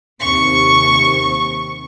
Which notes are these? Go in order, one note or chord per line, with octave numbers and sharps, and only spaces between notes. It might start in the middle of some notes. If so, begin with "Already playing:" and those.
D#2 C3 C#6